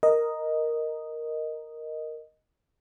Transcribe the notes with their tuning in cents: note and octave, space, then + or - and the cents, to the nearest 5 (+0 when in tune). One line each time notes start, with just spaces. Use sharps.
A#4 +0 D#5 +0